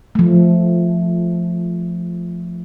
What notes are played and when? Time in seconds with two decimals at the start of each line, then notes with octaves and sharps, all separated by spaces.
0.15 F3 A3